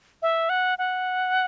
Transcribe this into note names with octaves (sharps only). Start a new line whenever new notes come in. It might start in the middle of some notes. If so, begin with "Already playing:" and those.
E5
F#5
F#5